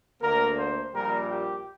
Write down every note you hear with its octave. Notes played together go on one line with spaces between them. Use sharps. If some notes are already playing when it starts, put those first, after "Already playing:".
D2 D3 A#3 A#4
C5
A#1 A#2 G3 A#3 A#4
G4